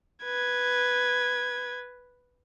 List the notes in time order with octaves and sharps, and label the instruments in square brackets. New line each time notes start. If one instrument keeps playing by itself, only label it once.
[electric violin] B4 G#6